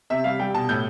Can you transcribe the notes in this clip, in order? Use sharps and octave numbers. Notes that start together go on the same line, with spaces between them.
C3 E5
G3 F5
G3 G5
B2 A5
A2 G6